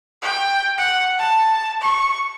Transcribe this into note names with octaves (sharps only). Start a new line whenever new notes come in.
G5
F#5
A5
C#6